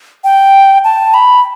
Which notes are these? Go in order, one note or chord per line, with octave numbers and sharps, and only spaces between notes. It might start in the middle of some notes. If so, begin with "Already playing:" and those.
G5
A5
B5